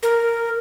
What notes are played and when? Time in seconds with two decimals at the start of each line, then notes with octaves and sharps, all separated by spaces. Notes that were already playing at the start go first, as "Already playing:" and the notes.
0.03 A#4